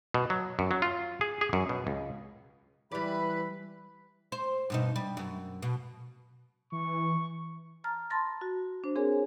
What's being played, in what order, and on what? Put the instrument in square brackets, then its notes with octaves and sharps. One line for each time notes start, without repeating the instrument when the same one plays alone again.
[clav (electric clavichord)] B2
F#3
F#2
F#3
F4
G#4
G#4
F#2
B2
C#2
[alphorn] E3 [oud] G3 D5 [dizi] B4 [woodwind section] E5 B5
[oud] C5
G2 B2 D#4
G3
F#2
B2
[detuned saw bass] E3 [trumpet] C#6
[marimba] A5 A#5 F6 A6
A5 B5 C6 A6 A#6
F#4
D4 C5
C4 G#4 A#4 C#5 G#5